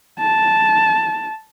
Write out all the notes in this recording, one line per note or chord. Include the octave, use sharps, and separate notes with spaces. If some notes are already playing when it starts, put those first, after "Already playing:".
A5